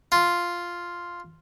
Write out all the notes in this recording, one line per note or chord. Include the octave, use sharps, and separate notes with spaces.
F4